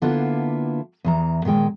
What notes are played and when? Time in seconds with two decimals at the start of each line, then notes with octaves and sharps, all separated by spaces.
0.02 D3 A#3 B3 D4 E4 F4
1.04 E2 E3 A#5
1.45 A#2 D#3 G#3 G5